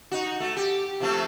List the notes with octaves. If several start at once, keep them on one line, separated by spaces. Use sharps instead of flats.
D#4 F#4
A3
G4
C3 F3 A3